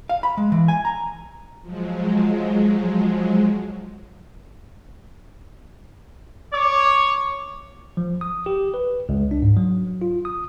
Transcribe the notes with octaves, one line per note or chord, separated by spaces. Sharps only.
F5
B5
G#3
E3
G#5
A#5
F3 F#3 G#3
C#5 D6
F3
D#6
G4
B4
C#2
D4
G#2
F#3
F4
D#6